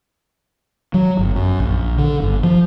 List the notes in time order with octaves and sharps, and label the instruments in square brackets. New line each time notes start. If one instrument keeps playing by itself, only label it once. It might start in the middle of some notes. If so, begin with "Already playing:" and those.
[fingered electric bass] F#3
G1
F#2
A#1
D3
G1
F3